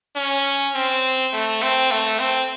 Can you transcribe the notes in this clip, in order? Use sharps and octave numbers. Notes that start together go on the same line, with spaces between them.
C#4
C4
A3
C4
A3
C4